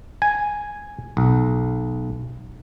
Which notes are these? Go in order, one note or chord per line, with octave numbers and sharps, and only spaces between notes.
G#5
B1